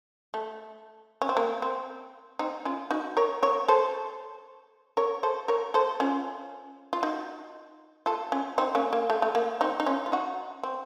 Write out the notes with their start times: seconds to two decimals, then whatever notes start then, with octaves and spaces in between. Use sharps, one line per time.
0.34 A3
1.22 C#4
1.29 C4
1.37 A#3
1.62 C4
2.39 C4 D#4
2.65 C#4 F4
2.91 D#4 F#4
3.17 A#4 C#5
3.43 A#4 C#5
3.68 A4 C5
4.97 A#4 C#5
5.23 A4 C5
5.48 A#4 C#5
5.74 A4 C5
6.00 C#4 F4
6.93 F4
7.03 D#4 F#4
8.06 F4 A4
8.32 C#4 F4
8.58 C4 D#4
8.75 A#3 C#4
8.93 A#3
9.10 A3
9.22 A3
9.35 A#3
9.61 C4 D#4
9.80 D#4
9.86 C#4 F4
10.06 F4
10.12 D#4 F#4
10.63 C4